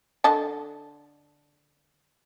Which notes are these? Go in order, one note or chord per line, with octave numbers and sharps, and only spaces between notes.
D3 D#5 A5